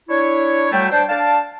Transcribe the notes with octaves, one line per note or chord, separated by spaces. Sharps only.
D4 E4 C#5
F#3 G3 A3 G5
D4 C5 G5 A5
D4 F5 A5